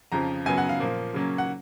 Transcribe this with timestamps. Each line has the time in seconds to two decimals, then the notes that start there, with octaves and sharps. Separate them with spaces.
0.12 F2 C#3 F3 A#5
0.46 F#2 C#3 F#3 B3 G#5
0.58 F#5
0.69 F5
0.80 A#2 F3 A#3
1.14 C#3 F#3 A#3 C#4
1.38 F#5